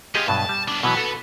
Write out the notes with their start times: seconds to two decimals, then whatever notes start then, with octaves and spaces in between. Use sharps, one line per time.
0.15 B3 F4 G4 G#4 D#5
0.28 G2 B2 F#3 A5
0.49 G3
0.68 B3 D4
0.83 B2 E3 F#3 B4 F#5
0.96 F#4 A4